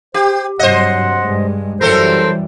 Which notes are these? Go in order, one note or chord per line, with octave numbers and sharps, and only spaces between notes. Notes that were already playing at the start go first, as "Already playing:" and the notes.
G4 C5
G2 C3 F#3 C5 D#5 F#5
G2 G#3
F#2 E3 G3 C4 A4 A#4 C5